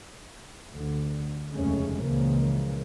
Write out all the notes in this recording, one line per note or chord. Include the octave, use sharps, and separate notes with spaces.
D2 D3
F1 D#2 C#3 G#3 A3 C#4
C#2 A#2 C#3 E3 F3 A#3